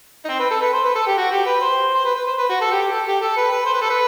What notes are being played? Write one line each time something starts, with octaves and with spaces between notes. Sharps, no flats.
D#4
C4
B4
A4
B4
C5
B4
A4
G4
F#4
G4
B4
C5
C5
B4
B4
C5
B4
F#4
A4
G4
A4
G4
A4
B4
B4
C5
B4
A4
B4